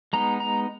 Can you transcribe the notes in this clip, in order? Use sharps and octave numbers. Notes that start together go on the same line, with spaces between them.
G#3 B3 D#4 A#5
A#5